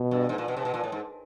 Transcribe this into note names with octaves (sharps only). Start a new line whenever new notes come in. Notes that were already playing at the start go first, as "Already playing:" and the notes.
Already playing: B2
G2
G#2
A#2
B2
C3
B2
A#2
A2
G#2